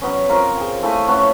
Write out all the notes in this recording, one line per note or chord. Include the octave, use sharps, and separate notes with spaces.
F#3 B3 C#4
C4 F4 A#4 C#5
G#4 G5
A3 E4 F5 G#5
A3 C#4 F#4 B4